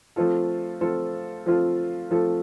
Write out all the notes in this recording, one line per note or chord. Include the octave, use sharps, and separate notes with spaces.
F3 A3 C4 F4 A4
F3 A3 C4 F4 A4
F3 A3 C4 F4 A4
F3 A3 C4 F4 A4